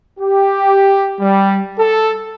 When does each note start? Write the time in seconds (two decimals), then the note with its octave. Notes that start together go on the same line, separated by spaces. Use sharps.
0.19 G4
1.20 G3
1.79 A4